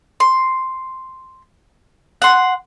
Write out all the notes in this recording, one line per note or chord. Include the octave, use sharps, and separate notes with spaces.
C6
F#5 C6